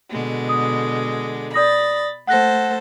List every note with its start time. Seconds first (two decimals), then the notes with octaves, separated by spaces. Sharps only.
0.11 B2 D3 G#3
0.49 D#6
1.54 D5 B5 D#6 A6 A#6
2.27 A3 A4 C5 F#5 F#6 A#6